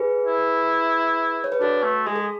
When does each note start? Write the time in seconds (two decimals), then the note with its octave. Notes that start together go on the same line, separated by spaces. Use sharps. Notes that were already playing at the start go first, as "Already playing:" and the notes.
Already playing: G#4 B4
0.26 E4
1.44 C#5
1.52 B4
1.61 D4 F#4 A4
1.83 A3
2.06 G#3 G#4
2.16 A4